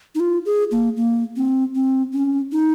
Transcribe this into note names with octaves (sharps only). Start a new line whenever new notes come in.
D#4
F4
G#4
A#3
A#3
C4
C4
C#4
D#4